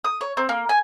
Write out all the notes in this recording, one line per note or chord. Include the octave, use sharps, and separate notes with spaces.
D#6
C#5
C4
A#3
G#5